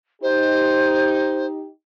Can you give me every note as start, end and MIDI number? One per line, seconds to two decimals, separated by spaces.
0.22 1.70 63
0.22 1.70 67
0.22 1.46 72